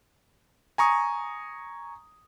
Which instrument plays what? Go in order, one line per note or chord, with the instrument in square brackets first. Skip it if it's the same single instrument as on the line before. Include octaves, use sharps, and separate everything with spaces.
[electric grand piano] G#5 A#5 C#6 D#6